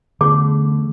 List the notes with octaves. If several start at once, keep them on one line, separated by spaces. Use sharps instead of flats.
D3 E3 A3 B3 C#4 G#4 D6